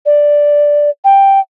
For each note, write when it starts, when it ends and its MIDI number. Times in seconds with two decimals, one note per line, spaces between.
0.06 0.90 74
1.04 1.40 79